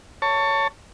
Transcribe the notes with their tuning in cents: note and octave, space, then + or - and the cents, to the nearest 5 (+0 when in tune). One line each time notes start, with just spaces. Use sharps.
C#5 +10 A5 +25